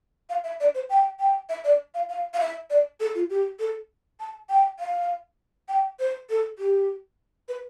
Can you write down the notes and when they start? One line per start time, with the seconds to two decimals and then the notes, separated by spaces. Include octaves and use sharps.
0.30 F5
0.44 E5
0.60 D5
0.75 C5
0.90 G5
1.19 G5
1.49 E5
1.64 D5
1.94 F5
2.09 F5
2.34 F5
2.40 E5
2.70 D5
3.00 A4
3.15 F4
3.30 G4
3.59 A4
4.20 A5
4.49 G5
4.80 F5
5.69 G5
5.99 C5
6.30 A4
6.59 G4
7.48 B4